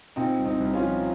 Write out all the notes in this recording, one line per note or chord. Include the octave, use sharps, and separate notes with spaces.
A#2 C4 D#4
C2
C4 D#4
C2
C#4 F4
F3